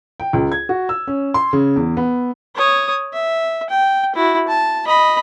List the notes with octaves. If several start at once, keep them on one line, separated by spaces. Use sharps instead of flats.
G5
C#2
G#6
F#4
E6
C#4
C6
C#3
E2
B3
C#5 D#6
E5
G5
E4 F#4
A5
D#5 B5